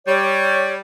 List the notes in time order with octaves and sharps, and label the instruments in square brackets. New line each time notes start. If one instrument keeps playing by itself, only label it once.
[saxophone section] G3 [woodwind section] C#5